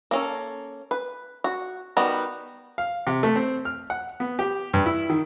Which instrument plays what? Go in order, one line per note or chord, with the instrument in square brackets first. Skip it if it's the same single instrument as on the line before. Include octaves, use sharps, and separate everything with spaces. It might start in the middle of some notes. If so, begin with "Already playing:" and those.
[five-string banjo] A#3 C#4 A4
B4
F#4
D#3 G3 B3 F#4
[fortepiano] F5
C3
A3
C4
F6
F#5
B3
G4
G2
E4
D#3